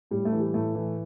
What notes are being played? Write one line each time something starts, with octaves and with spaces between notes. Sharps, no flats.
A2 G3
A3
E3
G3
A2 A3
E3